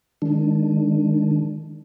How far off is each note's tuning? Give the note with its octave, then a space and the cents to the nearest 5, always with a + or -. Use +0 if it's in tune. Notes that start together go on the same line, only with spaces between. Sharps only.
D#3 +0 G#3 +0 D4 +0